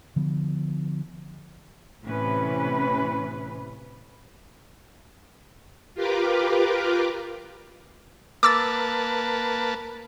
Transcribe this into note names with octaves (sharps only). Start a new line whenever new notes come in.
D3 F3 B3
A2 C3 E3 C#4 B4
F4 G4 A#4 B4 D6
A#3 B4 A5 D6 E6 A6